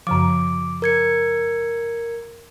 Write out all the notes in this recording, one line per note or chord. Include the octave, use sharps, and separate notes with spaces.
F#2 C#3 F3 D6
A#4 G#6 C#7